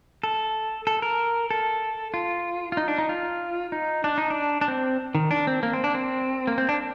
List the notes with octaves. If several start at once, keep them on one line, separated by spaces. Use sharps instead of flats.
A4
A4
A#4
A4
F4
F4
D#4
D4
D#4
F4
D#4
D4
D#4
D4
D4
C4
D#3
D4
C4
A#3
C4
D4
C4
A#3
C4
D4